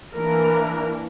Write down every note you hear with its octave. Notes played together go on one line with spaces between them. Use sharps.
E3 A#3 D4 A#4